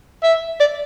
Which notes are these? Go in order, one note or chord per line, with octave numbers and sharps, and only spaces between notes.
E5
D5